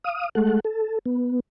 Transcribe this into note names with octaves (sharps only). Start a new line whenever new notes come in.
F5 D#6
G#3 A3 A4 F#5
A4
B3